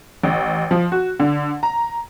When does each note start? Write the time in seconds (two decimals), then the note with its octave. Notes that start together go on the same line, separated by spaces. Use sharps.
0.24 A1
0.71 F3
0.92 F#4
1.20 D3
1.63 A#5